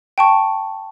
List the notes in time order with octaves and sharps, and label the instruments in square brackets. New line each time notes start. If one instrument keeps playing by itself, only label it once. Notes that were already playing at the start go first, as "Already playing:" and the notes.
[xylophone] G5 A5 C#6